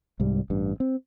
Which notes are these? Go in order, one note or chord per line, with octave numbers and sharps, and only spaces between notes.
C2 G#2 G3
A1 G2
C4